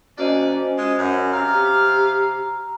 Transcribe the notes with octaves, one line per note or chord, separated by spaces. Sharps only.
D2 A#3 C#4 F#4 C5 D5 D#5
G#3 F4
F#2
C3 F5 A#5 E6
G4